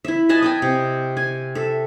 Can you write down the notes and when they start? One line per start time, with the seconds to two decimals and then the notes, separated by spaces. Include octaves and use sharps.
0.05 E4 E5
0.29 B4 D#5 G#5 A5
0.42 D#5 G5 G#5
0.62 C3
1.17 G#5
1.55 A4 E5